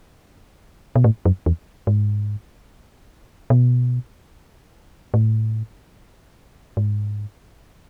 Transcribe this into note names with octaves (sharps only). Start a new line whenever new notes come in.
B2
A2
F#2
E2
G#2
B2
A2
G#2